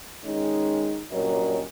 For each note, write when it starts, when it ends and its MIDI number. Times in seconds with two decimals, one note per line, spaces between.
0.25 1.02 51
0.25 1.02 56
0.25 1.02 61
0.25 1.02 63
1.11 1.63 43
1.11 1.63 46
1.11 1.63 54
1.11 1.63 61
1.11 1.63 70
1.11 1.63 75